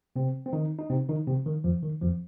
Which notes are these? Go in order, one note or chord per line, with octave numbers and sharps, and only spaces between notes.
C3 C4
C4
D#3 D#4
D#4
C3 C4
D#3 D#4
C3 C4
D#3
F2 F3
D#3
F2 F3